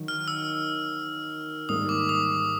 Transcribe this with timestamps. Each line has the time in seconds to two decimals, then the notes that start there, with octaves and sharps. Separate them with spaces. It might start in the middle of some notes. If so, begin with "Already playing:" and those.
Already playing: D#3 F#3
0.08 F6
0.28 E6
1.69 G#2 D#3 G3 A#3 D#4 D#6
1.89 D6
2.09 D#6